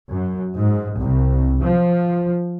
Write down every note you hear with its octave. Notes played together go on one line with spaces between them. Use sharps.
F#2
G#2
C2
F3